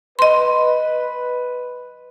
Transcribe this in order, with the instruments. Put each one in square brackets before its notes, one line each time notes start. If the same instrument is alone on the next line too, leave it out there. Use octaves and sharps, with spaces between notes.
[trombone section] B4 [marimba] D#5 C6